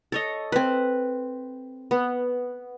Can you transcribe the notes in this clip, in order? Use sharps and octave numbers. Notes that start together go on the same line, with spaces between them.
A4 C#5 D#5
C4 B4
B3